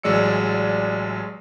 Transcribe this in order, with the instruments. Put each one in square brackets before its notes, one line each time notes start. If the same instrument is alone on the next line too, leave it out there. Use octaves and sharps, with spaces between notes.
[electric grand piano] A1 F#3 G#3 D5 E6 C#7